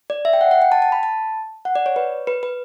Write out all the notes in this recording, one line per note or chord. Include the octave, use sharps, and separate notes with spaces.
D5
E5
G5
F#5
F#5
G5
A5
A5
B5
A5
F#5
D5
C#5
B4
B4
B4